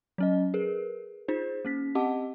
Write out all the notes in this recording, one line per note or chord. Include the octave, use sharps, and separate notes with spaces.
F#3 C#4 D#5
G#4 A#4 B4
D#4 F4 G#4 C5
A#3 C#4 B6
C4 G4 D#5 F#5 A5 D6